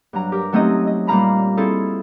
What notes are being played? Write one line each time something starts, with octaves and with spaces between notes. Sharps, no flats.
G2 F#3 A#5
G4 A#4
F#3 A3 C4 C#4 D#4 D#5
D#5
A#2 G3 F5 A#5 B5
C4 E4 F4 G#4 A4